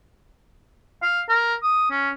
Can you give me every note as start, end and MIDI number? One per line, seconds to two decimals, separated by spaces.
1.02 1.21 77
1.29 1.55 70
1.63 1.87 87
1.90 2.10 61